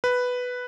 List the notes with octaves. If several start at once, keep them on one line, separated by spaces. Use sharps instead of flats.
B4